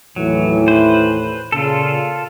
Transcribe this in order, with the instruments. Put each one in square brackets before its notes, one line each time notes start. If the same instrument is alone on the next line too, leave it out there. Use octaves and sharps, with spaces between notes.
[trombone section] D#2 A2 E3 [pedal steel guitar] F#3
[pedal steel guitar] B4 C5
[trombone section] A#2 C#3 [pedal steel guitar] F4 A4